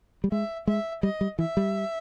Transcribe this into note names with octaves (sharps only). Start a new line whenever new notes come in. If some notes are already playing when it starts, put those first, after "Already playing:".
G3
G#3 E5
G#3 E5
G3 D#5
G3
E3 E5
G3